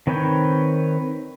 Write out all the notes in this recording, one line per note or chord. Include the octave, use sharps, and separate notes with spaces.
D#3 C4 B4 C#5 G5